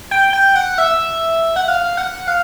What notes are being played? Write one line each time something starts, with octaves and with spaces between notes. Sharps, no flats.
G5
G5
F#5
E5
F#5
F5
F#5
F5